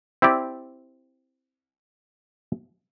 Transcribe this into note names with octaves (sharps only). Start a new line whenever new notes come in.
C4 E4 G4 D5